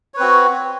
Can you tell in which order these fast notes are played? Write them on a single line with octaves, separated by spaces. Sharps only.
C#5 B4 C4 F#4